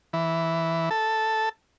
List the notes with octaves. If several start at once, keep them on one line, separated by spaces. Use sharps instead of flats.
E3
A4